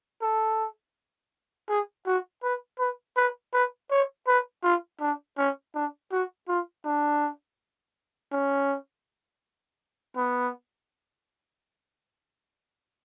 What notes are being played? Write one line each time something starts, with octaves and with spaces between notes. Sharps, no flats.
A4
G#4
F#4
B4
B4
B4
B4
C#5
B4
F4
D4
C#4
D4
F#4
F4
D4
C#4
B3